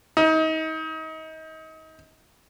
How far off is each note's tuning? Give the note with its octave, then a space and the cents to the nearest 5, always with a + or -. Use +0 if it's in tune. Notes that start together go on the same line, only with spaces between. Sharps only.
D#4 +30